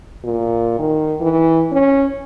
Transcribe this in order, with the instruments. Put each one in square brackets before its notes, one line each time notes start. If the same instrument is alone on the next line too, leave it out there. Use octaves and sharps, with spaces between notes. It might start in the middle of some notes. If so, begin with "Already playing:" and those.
[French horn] A#2
D#3
E3
C#4